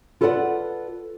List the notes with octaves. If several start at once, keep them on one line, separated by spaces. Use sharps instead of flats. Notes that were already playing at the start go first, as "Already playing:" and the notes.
F4 A4 B4 D5 F5 F#5